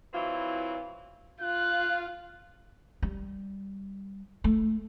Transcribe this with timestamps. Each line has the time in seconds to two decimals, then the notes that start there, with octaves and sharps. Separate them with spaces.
0.14 E3 F#3 C4 E4 F4
1.41 F4 F5 F#6
3.02 G3
4.44 A3